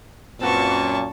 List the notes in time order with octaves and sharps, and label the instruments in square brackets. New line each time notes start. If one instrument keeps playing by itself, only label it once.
[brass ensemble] F#2 A#2 [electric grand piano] C4 F#4 B4 [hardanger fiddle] A5 C#6